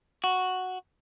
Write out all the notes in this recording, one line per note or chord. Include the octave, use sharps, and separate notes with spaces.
F#4